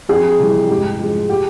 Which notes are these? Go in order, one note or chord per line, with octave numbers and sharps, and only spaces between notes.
F2 G#4
C3 E3 G3
G#2 G4
F3 G#3
G4